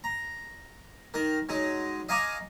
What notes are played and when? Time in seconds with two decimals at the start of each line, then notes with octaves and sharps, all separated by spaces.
0.04 A#5
1.14 D#3 A#4
1.49 F#3 G#3 D#4
2.09 D#5 F5 G#5 A#5 C#6 D6